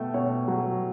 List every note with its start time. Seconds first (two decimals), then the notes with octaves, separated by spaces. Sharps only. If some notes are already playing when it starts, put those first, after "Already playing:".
Already playing: B2 A3 G5
0.14 B2 C#5
0.48 F#3